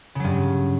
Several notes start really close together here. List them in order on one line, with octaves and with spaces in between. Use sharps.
C#3 F#3 G2